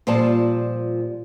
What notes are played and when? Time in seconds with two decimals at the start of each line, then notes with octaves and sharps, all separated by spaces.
0.07 A#2 F3 G3 C5 A5